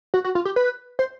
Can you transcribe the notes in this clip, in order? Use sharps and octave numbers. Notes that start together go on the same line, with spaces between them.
F#4
F#4
F4
G4
B4
C5